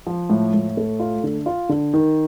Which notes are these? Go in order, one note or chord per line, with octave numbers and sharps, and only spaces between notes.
F3
A2
A2
A3
F4
D3
F4
D3
D#3